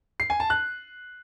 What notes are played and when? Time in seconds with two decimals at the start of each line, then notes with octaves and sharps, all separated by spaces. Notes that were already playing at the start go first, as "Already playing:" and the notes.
0.20 C7
0.30 G#5
0.40 A5
0.50 F#6